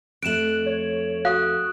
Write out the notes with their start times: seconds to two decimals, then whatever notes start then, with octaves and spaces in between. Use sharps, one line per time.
0.23 F2 A3 F#6 D7 E7 F#7
0.66 C#5
1.25 F#4 F5 D#6 F#6